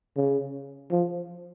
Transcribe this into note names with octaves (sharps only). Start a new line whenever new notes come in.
C#3
F3